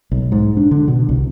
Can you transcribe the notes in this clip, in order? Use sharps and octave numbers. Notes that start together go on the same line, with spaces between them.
B1
G#2
D4
D3
B2
C2